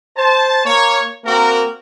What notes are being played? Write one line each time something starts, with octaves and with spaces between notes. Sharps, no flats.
C5 A5
A#3 C#5
A#3 C4 F#4 A#4